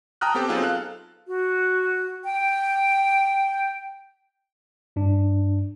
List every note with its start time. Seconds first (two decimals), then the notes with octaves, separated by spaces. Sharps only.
0.21 G5 A5 A#5 D#6 F6 F#6
0.35 B3 C4 G4 A4 G5
0.49 F#3 B3 C4 D#4 F4 G#4
0.62 A4 F5 F#6
1.27 F#4
2.25 G5
4.96 G2 D4